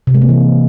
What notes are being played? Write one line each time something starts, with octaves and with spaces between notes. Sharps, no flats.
C3
G#3
A#3
E3